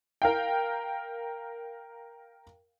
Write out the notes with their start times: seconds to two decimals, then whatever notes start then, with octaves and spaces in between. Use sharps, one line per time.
0.22 A#4 F5 G5